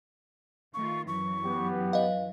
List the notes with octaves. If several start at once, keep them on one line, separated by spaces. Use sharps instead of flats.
D#3 A3 F4 C#6
F#2 E3 F#3 C#6
B3 G4
B4 D#5 F5